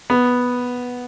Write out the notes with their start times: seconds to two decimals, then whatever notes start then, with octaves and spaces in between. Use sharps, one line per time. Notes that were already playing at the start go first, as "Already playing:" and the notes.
0.10 B3